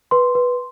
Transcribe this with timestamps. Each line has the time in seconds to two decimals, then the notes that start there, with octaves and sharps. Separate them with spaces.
0.11 B4 C6
0.35 B4